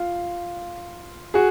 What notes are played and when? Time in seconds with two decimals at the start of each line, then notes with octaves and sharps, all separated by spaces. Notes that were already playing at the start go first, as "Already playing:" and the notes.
Already playing: F4
1.34 F#4 G#4